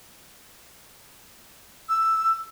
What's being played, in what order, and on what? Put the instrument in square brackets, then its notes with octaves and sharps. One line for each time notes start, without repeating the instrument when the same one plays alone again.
[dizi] E6